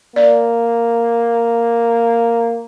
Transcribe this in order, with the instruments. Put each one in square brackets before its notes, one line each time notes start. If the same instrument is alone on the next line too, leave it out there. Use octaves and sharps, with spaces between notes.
[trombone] A#3 [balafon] D5